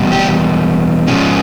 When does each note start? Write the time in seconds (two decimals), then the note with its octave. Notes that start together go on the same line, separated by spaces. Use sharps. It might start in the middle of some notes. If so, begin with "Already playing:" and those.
Already playing: E2 B2 G3
0.12 G4
1.07 G#2 F3 G#3 C#4